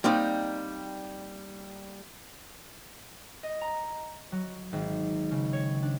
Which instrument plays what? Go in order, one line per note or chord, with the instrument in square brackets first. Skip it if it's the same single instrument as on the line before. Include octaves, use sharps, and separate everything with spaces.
[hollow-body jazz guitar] G3 A#3 C4 D#4
[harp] D#5
A#5
F#3
G#1
C#3
C#5
D4